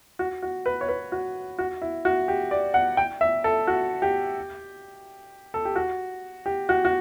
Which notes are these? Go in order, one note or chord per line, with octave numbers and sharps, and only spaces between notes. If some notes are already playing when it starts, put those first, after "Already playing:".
F#4
F#4
B4
C#5
B4
F#4
F#4
E4
F#4
G4
D5
F#5
G5
E5
A4
F#4
G4
A4
G4
F#4
G4
F#4
F#4